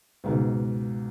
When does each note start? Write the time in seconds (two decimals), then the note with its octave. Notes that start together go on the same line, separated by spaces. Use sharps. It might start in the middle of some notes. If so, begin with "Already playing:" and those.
0.24 C#2 G#2 B2